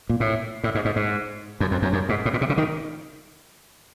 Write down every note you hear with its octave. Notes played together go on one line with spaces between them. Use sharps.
A#2
A2
A2
G#2
G#2
G#2
F#2
F2
F#2
F#2
G#2
A2
A#2
C3
C#3
D#3